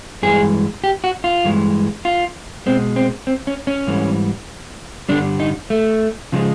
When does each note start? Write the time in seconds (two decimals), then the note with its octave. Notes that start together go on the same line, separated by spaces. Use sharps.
0.23 G2 E3 G#3 G#4
0.84 G4
1.04 F#4
1.24 F4
1.45 G2 E3 G#3
2.05 F4
2.66 B2 G#3 C4
2.96 C4
3.27 C4
3.47 C#4
3.67 C#4
3.87 G#2 E3 G3
5.09 G2 D3 G3 D4
5.40 D#4
5.70 A3
6.32 C#3 F3 G#3